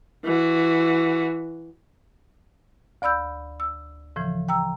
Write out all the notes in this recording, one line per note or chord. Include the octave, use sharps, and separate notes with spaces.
E3 F#4
D2 D5 B5 E6 G6
E6
A2 C#3 E3 F3
G5 A#5 E6